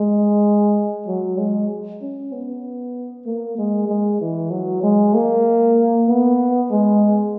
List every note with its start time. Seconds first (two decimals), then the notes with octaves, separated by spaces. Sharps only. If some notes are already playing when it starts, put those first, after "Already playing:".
Already playing: G#3
1.07 F#3
1.38 G#3
2.02 C#4
2.32 B3
3.26 A#3
3.58 G#3
3.88 G#3
4.21 E3
4.51 F#3
4.83 G#3
5.14 A#3
6.08 B3
6.71 G#3